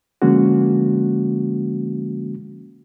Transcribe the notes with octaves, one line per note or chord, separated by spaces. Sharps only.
D3 F3 G#3 A#3 C#4 F#4